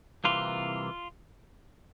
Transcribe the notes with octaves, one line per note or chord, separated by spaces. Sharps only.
C2 C3 E3 A#3 F4